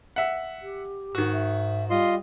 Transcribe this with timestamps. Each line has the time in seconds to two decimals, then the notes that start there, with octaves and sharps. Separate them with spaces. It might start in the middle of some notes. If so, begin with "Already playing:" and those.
0.16 E5 F#5
0.62 G4
1.15 G#2 D#3 F#4
1.32 E5
1.90 G3 F4 D#5 C6